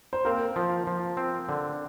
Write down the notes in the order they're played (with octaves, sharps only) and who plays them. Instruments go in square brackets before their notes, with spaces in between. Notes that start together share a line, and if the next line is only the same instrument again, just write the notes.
[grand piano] C5
[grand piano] A#3 A#4 [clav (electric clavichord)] C4
[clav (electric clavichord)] F3
F3
C4
D3